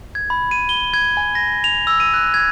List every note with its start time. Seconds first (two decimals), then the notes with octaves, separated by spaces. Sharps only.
0.15 G#6
0.30 B5
0.51 D#7
0.69 G7
0.94 G#6
1.17 G#5
1.35 A#6
1.64 F7
1.87 E6
2.00 D#7
2.14 F#6
2.34 G#6